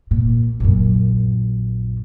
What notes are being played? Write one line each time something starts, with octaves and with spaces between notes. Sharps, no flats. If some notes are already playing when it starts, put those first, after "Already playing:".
A#2
A#1 F#2